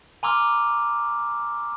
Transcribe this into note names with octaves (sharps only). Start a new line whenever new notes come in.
G#5 A#5 C6 D6 E6 F6